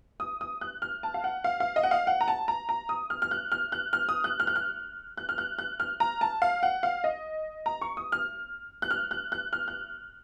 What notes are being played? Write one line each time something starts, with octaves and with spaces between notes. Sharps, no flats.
D#6
D#6
F#6
F6
A5
F5
F#5
F5
F5
D#5
F#5
F5
F#5
A#5
A5
A#5
A#5
D#6
F6
F6
F#6
F6
F#6
F6
D#6
F#6
F6
F#6
F6
F#6
F6
F#6
F#6
F6
A#5
A5
F5
F#5
F5
D#5
A#5
C#6
D#6
F6
F#6
F6
F#6
F#6
F6
F#6